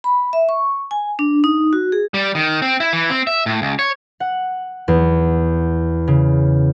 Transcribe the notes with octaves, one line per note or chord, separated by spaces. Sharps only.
B5
E5
C#6
G#5
D4
D#4
F#4
G#4
G3
D#3
C4
E4
E3
C4
E5
A2
C#2
C#5
F#5
E2
C#3